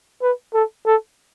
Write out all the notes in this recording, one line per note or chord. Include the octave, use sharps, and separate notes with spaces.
B4
A4
A4